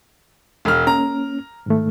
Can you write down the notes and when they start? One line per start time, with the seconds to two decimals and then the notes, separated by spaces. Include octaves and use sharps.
0.65 E1 F6
0.87 A#3 C#4 A#5
1.66 G#2 D#3 A3